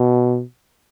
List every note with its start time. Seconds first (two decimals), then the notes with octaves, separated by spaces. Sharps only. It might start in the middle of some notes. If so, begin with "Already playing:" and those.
Already playing: B2